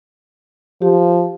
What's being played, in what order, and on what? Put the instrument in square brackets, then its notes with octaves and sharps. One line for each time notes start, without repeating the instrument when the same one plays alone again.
[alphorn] F3 [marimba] G4